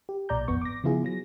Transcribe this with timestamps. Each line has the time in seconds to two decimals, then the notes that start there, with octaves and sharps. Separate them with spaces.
0.09 G4
0.29 B1 A#2 D5 A#5 G6
0.48 G#1 F2 B3 C#6
0.62 D6 A#6
0.84 C#3 F3 B3 E4 F4 G#4
1.05 F#3 A#6